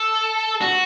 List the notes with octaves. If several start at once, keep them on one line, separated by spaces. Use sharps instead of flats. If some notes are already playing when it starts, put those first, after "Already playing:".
Already playing: A4
F#4